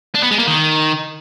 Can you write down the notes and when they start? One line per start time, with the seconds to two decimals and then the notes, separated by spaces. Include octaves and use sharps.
0.15 D4
0.23 B3
0.31 G#3
0.39 A#3
0.47 D#3